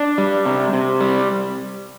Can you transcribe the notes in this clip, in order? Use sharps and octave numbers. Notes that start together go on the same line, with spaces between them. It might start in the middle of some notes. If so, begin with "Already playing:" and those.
Already playing: D4
G3
C3
C3
G3